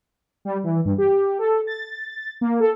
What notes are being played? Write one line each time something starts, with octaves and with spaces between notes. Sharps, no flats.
G3
E3
G2
G4
A4
A6
A#3
A4